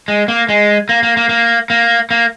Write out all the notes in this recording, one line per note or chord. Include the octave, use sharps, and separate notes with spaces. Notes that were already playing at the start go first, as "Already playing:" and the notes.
G#3
A#3
G#3
A#3
A#3
A#3
A#3
A#3
A#3